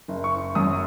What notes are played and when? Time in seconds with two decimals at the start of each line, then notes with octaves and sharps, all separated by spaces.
0.08 F#1
0.24 C#6
0.55 F#2 D#6